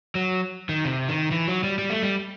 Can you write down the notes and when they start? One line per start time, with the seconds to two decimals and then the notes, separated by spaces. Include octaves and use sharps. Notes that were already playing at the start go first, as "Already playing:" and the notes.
0.15 F#3
0.69 D#3
0.85 C3
1.08 D#3
1.31 E3
1.48 F#3
1.64 G3
1.79 G3
1.90 A3
2.03 G3